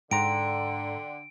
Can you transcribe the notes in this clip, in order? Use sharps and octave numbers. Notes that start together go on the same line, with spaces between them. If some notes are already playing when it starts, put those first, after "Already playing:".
G#2 D3 G5 A#5 C6 D7